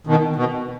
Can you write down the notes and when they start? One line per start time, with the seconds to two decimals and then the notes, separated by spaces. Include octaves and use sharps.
0.07 B2 D#3
0.36 B2